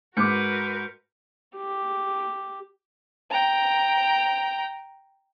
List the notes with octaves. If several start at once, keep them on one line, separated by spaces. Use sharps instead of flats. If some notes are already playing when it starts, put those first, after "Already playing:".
G#2 F#4 A#4 B4 D6 F6 G6 C#7
G4
G5 A#5